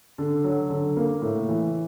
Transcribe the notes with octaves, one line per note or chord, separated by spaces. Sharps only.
D3
F#3
D3
A#3
A2
E3